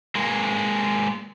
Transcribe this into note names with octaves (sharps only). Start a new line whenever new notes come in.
G#3 A#3